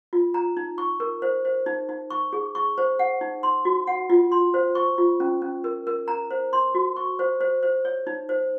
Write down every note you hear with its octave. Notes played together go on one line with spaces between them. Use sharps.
F4
A#5
D#4
C#6
A#4
C5
C5
D#4
D#4
C#6
G#4
C#6
C5
F#5
D#4
C6
F#4
F#5
F4
C6
C5
C#6
F4
C#4
C#4
A#4
A#4
A#5
C5
C6
F#4
C#6
C5
C5
C5
C#5
D#4
C5